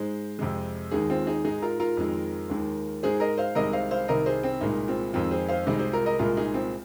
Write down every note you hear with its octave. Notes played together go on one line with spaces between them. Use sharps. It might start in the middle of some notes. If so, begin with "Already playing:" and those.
Already playing: G#2 G#3 C5
F2 C3 G#3
D#2 D#3 G#3 D#4 G#4
C4 F4
D#4 G#4
G#2 G#3 D#4 G#4
F4 A#4
F4 A#4
F2 D#3 G#3
D#2 D#3 G#3
G#2 G#3 G#4 C5
A#4 D#5
C5 F5
C2 C3 D#3 G#3 A#4 D#5
C5 F5
C5 F5
C2 C3 D#3 A#4 D#5
G#4 C5
C4
C2 A#2 G#3 D#4
C4 F4
F2 D#3 G#3 C4 F4
G#4 C5
C5 F5
C2 C3 G#3 D#4 G#4
G#4 C5
F4 A#4
A#4 D#5
C2 A#2 G#3 F4 A#4
D#4 G#4
C4 F4